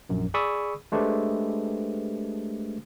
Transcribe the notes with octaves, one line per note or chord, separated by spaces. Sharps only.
A#1 F#2
G#4 D5 B5 C#6 D#6 E6
G#3 A3 D4 G4 B4 C5